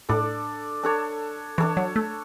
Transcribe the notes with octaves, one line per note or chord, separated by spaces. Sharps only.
A2 D4 A4 D5
D4 A4 C#5
E3 D4 A4 C#5
F#3
A3